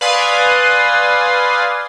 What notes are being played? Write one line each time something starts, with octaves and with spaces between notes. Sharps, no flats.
B4 D5 F5 G#5 C6 D#6